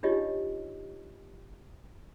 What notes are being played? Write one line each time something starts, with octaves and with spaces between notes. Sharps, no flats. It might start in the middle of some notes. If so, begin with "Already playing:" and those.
D4 D#4 F4 G4 C#5 D#5